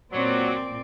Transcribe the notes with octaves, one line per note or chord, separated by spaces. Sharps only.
A#2 F#3 C4 D5